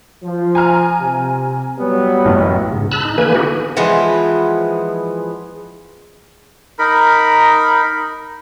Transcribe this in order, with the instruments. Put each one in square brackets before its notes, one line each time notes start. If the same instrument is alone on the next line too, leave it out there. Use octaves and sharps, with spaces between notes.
[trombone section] F3
[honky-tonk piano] G#5 A#5 F6
[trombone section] C3
F#3 G3 B3
[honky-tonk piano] A1 F#2
[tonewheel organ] G#2 C#3
A5 B5 E6 F#6
D#4
D3 E3 A#3 B4 G#5
B3 D#4 E4 F#4 G4
[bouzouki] E3 F3 G#3 B3
[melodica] D#4 A#4 B5